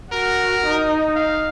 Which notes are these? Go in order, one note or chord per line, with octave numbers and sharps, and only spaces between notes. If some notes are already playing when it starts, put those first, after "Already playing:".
F#4 A#4
D#4
F5